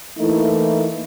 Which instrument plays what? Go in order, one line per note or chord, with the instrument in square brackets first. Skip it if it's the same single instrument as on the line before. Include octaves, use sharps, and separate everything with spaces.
[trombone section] E3 A3 A#3 D#4 E4